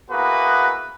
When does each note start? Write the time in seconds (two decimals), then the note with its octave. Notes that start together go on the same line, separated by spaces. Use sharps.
0.11 A#3 B3 E4 F#4 G#4 B4